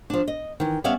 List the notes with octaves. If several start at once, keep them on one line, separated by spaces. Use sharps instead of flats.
F3 D4
D#5
D#3 E3
G3 B3 C#4 D5 E5 F5